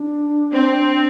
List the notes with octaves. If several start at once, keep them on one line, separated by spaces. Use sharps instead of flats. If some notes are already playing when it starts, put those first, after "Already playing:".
Already playing: D4
C4